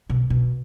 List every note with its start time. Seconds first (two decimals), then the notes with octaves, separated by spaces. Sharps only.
0.09 B2
0.30 B2